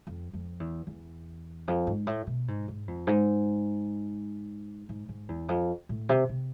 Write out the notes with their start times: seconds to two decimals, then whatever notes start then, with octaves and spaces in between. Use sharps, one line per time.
0.07 F2
0.34 F2
0.60 E2
0.87 E2
1.68 F2
1.87 G#2
2.07 A2
2.27 B2
2.48 G#2
2.68 G#2
2.88 F2
3.07 G#2
4.89 G#2
5.09 G#2
5.29 E2
5.49 F2
5.89 A2
6.09 C3
6.29 C3